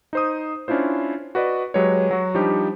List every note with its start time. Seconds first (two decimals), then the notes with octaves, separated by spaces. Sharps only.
0.13 D#4 C5 D#6
0.68 C#4 D4 E4 F4 C5
1.35 F#4 B4 D5 D#5
1.74 F#3 G#3 G4 B4 C#5
2.11 F#3 F#4
2.35 F3 G3 D4 D#4 G4